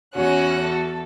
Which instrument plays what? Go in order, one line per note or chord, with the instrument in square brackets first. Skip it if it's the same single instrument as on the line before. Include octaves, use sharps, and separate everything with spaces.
[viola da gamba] E2 [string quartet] C#4 F#6 [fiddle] F#4
[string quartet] A4